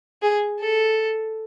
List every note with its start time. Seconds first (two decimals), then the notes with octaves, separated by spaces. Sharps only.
0.22 G#4
0.60 A4